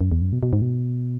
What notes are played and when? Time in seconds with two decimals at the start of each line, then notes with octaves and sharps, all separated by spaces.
0.01 F#2
0.12 E2
0.21 F#2
0.33 B2
0.43 B2
0.53 G#2
0.62 B2